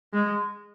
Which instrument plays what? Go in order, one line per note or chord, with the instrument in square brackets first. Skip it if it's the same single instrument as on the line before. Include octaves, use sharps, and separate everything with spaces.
[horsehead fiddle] G#3